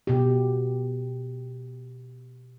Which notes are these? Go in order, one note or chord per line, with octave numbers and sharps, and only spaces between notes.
B2 G4